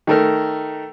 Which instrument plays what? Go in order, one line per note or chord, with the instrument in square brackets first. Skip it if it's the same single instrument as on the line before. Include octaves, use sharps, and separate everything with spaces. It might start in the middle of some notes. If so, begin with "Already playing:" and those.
[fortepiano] D#3 A3 A#4